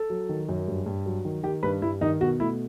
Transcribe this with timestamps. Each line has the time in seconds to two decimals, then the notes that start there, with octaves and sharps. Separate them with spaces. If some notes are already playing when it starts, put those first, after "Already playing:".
Already playing: A4
0.10 F#3
0.29 D#3
0.49 F#2
0.68 G2
0.86 G2
1.06 F#3
1.25 D#3
1.43 D#3 G4
1.63 G2 B4
1.82 G2 E4
2.01 D#3 D#4
2.21 B2 F#4
2.40 A3 E4